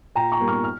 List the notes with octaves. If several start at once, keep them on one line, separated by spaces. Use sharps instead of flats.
A#2 G5 A#5
A#5 C#6
G3 A#3
C#6 F6
F6